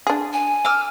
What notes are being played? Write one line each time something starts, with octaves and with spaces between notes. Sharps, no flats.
D4 G#4
G#5
D6 E6 F6